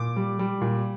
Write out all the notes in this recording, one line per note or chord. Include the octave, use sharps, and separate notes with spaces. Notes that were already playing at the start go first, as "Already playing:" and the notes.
Already playing: A#2 D6
G3
G3
A#2